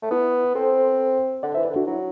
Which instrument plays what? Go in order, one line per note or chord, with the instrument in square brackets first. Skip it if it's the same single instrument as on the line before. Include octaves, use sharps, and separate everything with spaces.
[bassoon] A3
[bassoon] B3 [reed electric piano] E4
[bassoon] C4 [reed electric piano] A4 C5
[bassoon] D3 [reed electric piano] D5 F#5
[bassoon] E3 [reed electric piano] C5 E5
[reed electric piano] B4 D5
[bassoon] D3
[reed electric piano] D4 F#4
[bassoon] F#3 [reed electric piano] E4